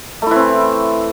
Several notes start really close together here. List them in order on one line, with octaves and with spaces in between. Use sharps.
A3 E4 E3 C4